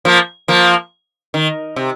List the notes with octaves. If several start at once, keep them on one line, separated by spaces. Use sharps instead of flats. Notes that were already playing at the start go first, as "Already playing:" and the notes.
F3 A#3
F3 A#3
D#3
C3